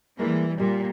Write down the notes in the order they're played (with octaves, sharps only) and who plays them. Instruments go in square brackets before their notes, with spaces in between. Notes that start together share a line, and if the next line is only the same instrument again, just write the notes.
[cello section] E3 G3 [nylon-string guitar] G#3 A#3
[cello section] A#2 [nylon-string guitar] G3